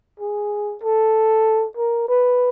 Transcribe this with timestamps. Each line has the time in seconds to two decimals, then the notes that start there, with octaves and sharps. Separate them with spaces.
0.20 G#4
0.82 A4
1.77 A#4
2.09 B4